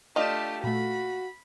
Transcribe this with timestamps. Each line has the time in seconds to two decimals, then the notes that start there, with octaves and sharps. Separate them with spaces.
0.16 A3 D4 F4 G4 D5 D#5 E7
0.64 A#2 A3 F#4 B5